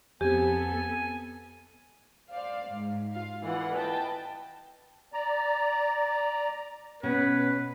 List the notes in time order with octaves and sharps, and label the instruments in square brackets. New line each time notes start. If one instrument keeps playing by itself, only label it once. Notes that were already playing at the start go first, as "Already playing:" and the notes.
[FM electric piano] F2 C4 [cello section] B3 A4 [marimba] G4 [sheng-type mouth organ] G#5
[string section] C5 D5 F5
G#2
F4 F5
E3 F4 D5 F#5
B4 D#5 G5 A5
[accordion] D5 A#5
[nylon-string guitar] B2 C#4 [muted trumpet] B4